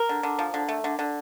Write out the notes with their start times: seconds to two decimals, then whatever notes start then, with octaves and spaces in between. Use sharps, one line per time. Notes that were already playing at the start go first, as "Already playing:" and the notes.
Already playing: A#4
0.09 D3
0.23 D3
0.39 F3
0.54 D3
0.69 A3
0.84 D3
0.99 D3